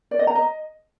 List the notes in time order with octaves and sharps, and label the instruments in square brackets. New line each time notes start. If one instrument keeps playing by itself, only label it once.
[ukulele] D5
D#5
A#5
D#5